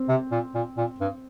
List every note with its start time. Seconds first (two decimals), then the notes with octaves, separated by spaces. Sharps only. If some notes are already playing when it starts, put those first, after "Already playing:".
Already playing: C4
0.08 C3
0.31 A#2
0.54 A#2
0.77 A#2
1.01 G2